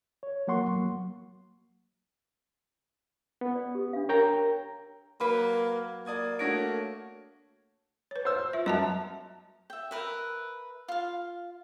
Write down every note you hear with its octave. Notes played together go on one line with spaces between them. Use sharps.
C#5
F#3 A#3 F#5 C6 C#6
F#3 A#3
B3
D5
G4 D#6
D4 F5
A#4 C#5 G5 A#5
F#3 A#3 B4 B5
A#3 D5 D#6 G#6
A3 D4 F#4 C#5 A#6 D7
B4 C#5
C5 E6
F4 E5
F#2 D#5 E5 A5
E5 G5
A#4 B4 E5
F4 F5